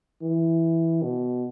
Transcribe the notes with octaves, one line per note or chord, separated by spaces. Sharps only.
E3
B2